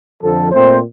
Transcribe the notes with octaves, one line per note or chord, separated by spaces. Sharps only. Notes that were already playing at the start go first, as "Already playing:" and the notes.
F2 D3 F3 A4
A#2 A3 C4 C5